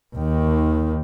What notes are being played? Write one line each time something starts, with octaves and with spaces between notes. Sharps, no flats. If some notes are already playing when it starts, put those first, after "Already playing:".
D#2 D#3